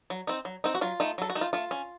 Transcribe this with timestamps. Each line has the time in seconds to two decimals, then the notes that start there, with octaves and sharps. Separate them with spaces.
0.10 F#3
0.27 C4 D#4
0.45 F#3
0.64 C4 D#4
0.75 F#4
0.81 F#3 F4
1.00 A3 D#4
1.18 F#3 A4
1.30 F#4
1.35 A3 D#4
1.41 F4
1.53 A3 F4
1.71 C#4